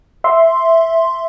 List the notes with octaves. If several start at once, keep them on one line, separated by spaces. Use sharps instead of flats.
E5 C6